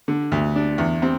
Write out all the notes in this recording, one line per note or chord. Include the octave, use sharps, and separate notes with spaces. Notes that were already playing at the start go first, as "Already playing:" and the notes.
D3
D2
D4
E2
C4